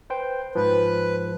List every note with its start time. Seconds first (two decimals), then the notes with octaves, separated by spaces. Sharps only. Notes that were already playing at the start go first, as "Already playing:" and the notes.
0.10 B4 C5 G5
0.55 G#2 F3 B4